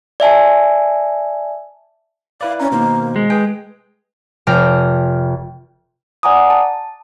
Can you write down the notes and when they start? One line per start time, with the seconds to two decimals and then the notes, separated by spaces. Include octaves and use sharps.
0.20 D5 E5 G#5 A5
2.41 E4 B4 D5 F5
2.60 C#4 A#5
2.72 B2 D#3 A#3 C5
3.16 G#3
3.30 G#4 B4 G5 G#5
4.47 F1 G5 F6 A#6
6.23 D5 F#5 G#5 A#5 D6 D#6
6.50 A5